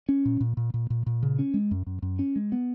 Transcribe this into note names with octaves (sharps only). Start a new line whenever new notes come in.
C#4
A#2
A#2
A#2
A#2
A#2
A#2
C#3
C#4
G#3
F#2
F#2
F#2
C#4
G#3
B3